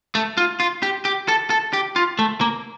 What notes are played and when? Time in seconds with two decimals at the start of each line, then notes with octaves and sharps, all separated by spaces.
0.15 A3
0.37 F4
0.60 F4
0.83 G4
1.05 G4
1.28 A4
1.50 A4
1.73 G4
1.96 F4
2.19 A3
2.41 A#3